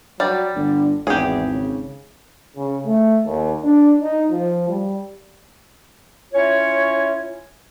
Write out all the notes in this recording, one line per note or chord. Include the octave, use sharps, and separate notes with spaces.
F#3 G3 D5
G1 D3
G#1 E2 G4 G#4
C#3
C#3
A3
D#2
D4
D#4
F3
G3
C#4 E4 F4 C#5